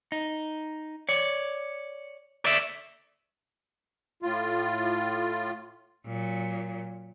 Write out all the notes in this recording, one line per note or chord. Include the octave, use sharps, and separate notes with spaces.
D#4
C#5 D5
D5 E5
A2 F4
A#2 F#3